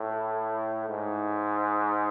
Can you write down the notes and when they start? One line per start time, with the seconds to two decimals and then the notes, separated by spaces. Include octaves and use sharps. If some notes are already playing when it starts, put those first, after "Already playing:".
Already playing: A2
0.88 G#2